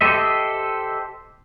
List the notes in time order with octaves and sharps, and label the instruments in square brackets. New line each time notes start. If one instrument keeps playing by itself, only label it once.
[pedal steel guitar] G4 A4 C5 D#5 E5